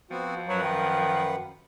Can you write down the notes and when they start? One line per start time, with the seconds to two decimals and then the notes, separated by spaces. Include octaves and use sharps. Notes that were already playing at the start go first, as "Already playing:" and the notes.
0.11 F3 B3 C4 F#4
0.49 F#2 F#3 B4 F#5
0.63 D#3